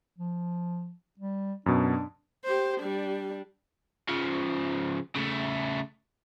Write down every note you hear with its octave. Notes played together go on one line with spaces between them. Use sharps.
F3
G3
F#2 B2 D4
G4 C5
G3 D4
C#3 F3
C#3 A3